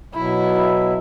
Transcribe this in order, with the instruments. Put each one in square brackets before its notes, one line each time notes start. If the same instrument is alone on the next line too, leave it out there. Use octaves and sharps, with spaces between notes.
[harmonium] B2 F#3 E5 [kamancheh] E4